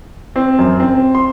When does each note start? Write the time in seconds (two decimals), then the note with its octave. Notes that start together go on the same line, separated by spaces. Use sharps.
0.36 C4
0.59 F#2
0.80 C4
1.15 C6